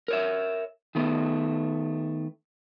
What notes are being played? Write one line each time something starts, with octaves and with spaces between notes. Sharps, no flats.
A#4 C#5 E5
D#3 A3 B3